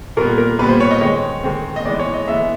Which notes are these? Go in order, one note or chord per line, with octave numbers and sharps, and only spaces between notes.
A#2 G3 B3 A#4
A#4
A#2 G3 B3 B4
C5
C#5
D#5
D#3 G#3 C4 C#5
D#3 G#3 C4
D#5
E3 G#3 B3 D5
C#5
D#5
E3 G#3 B3 E5